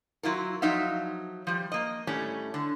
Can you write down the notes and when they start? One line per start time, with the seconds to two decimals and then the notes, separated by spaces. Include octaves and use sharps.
0.23 F#3 E4 F4 A#4
0.62 F3 F#3 D#4 E5 F5
1.47 F3 G3
1.72 A#3 D#5
2.07 A2 G3 A3 C#4
2.54 D3